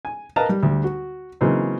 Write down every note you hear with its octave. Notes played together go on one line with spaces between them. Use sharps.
G#5
A#4 B4 D#5 F5 A5 A#5
G3
D2 G3
F#4
C#3 E3 F#3 A#3 C4 D#4